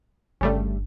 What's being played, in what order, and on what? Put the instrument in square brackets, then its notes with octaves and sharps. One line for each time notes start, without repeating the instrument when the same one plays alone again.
[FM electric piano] G1 [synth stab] C#3 G3 A3